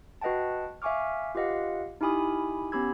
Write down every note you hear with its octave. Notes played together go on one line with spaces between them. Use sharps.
F#4 B4 D#5 F#5 G5 A5
E5 F5 G#5 C#6 D6 F6
F4 G4 B4 D#5 F5 F#5
D#4 E4 G4 G#5 B5 D#6
B3 C#4 G4 B5 E6 G#6